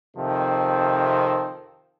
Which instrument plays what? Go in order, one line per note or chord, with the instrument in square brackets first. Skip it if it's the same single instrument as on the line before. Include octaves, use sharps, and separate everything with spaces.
[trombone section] F2 C3 D#3 F3 C4